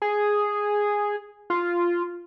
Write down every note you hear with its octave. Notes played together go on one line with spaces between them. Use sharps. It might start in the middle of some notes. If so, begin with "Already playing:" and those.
G#4
F4